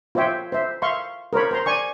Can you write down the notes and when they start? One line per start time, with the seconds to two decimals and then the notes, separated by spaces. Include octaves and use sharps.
0.15 F4 C5 C#5 E5 G5
0.52 C5 E5
0.82 E5 F5 C6 C#6
1.33 A#4 C5 C#5 B5
1.51 C5 A#5 C6
1.66 D5 G#5 C#6